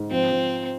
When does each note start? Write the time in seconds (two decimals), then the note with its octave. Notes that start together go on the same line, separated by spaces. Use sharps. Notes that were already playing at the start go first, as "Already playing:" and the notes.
Already playing: G#2
0.11 F3 C4
0.31 F3